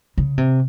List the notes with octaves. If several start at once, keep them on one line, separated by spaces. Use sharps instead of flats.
C#3
C3